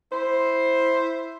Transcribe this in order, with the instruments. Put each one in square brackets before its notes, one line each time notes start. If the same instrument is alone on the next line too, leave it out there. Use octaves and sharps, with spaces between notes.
[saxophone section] E4 C5